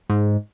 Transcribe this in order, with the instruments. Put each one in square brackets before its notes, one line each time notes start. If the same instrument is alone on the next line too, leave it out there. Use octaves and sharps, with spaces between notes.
[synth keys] G#2